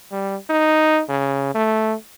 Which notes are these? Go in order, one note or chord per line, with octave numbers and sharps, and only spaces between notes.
G3
D#4
C#3
A3